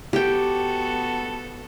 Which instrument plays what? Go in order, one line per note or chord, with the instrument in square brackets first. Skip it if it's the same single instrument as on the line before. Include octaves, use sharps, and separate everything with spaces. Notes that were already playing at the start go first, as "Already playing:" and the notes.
[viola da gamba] B3 F#4 A4 [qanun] G4 G5